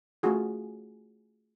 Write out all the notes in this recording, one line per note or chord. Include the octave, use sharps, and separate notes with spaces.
A3 C#4 F4 F#4 G#4